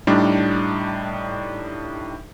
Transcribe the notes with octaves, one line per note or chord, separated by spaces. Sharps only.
A2 G3 D4 D#4